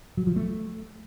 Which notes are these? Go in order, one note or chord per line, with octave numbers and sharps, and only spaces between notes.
F#3
F3
A3